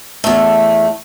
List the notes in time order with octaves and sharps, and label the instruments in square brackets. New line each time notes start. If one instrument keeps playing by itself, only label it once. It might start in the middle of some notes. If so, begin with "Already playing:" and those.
[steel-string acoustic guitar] E2 A3